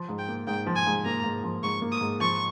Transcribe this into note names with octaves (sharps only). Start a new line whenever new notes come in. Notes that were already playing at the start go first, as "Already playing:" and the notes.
Already playing: F3
G#2
G5
A#3
G#2 G5
F3
G#5
G#2
A#3 A#5
G#2
F3
G#2 C#6
A#3
D#6
G#2
F3 C#6